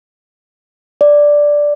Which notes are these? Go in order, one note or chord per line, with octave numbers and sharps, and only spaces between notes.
D5